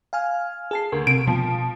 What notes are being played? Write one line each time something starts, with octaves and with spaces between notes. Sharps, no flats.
F5 G#5 F6
G#4 A5 C7
D2 A#4
C3 D7
B2 F3